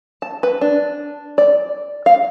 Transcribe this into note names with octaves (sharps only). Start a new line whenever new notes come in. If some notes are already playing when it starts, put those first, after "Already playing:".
A5
B4
D4
D5
F5